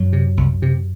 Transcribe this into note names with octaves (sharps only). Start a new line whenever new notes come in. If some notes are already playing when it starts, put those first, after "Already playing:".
Already playing: F#2 F#3
C3
C2
C3